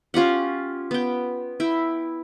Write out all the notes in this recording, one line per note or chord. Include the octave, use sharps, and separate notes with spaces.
C#4 F4 G4 F#5
B3 G5
E4 G5